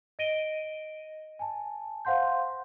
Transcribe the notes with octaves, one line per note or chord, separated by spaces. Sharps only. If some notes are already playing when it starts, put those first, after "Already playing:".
D#5 A#6 D7 D#7 G7
G#5 A5
C5 F5 F#5 C6 G6